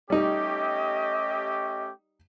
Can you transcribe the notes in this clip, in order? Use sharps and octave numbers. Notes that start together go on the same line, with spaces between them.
G3 A3 C#4 D#4 G4 D#5